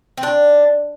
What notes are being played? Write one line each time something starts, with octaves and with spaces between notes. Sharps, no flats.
C4
D4